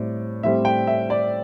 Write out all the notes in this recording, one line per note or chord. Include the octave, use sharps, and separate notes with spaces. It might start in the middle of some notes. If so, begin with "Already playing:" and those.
Already playing: A2 G3 C4 D5
A2 G3 C4 E5
G5
E5
D5